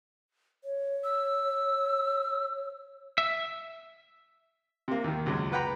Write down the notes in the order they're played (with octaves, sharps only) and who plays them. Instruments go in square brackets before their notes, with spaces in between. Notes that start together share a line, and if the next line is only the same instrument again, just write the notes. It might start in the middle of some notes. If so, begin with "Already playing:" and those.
[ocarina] C#5
[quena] E6
[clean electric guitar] E5
[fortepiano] C3 A#3
D#2 D#3
C#2 F#2 F#3 G#3
B4 F#5 G5 A#5 B5